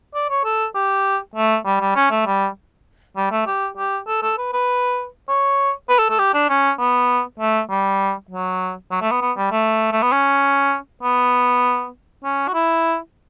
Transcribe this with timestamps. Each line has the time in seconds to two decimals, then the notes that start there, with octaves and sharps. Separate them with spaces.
0.14 D5
0.30 C#5
0.45 A4
0.75 G4
1.35 A3
1.66 G3
1.81 G3
1.96 C#4
2.11 A3
2.26 G3
3.17 G3
3.32 A3
3.47 G4
3.77 G4
4.07 A4
4.22 A4
4.38 B4
4.53 B4
5.28 C#5
5.89 B4
5.99 A4
6.09 A4
6.19 G4
6.34 D4
6.50 C#4
6.79 B3
7.39 A3
7.70 G3
8.31 F#3
8.91 F#3
9.02 A3
9.11 B3
9.21 B3
9.37 G3
9.52 A3
9.92 A3
10.02 B3
10.12 C#4
11.03 B3
12.24 C#4
12.48 F#4
12.54 E4